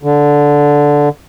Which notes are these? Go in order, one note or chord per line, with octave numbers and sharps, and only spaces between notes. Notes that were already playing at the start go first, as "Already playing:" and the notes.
D3